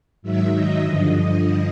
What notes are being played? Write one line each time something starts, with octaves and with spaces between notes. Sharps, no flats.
G#2 D#3 F#3 E5
D#5
G2 D3 F3